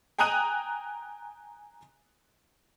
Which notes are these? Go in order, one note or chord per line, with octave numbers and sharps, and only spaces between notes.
G5 G#5 A#5 D#6 F#6 D#7